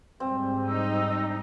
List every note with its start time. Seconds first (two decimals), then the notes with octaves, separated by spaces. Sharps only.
0.20 G#2 G3 C4
0.68 D#4 E6